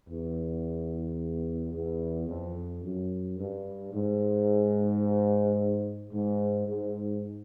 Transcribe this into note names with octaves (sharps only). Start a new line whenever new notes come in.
E2
E2
F2
F#2
G2
G#2
G#2
G#2